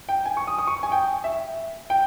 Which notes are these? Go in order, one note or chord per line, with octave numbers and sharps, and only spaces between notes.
G5
G#5
C#6
D#6
D#6
C#6
G#5
G5
E5
G5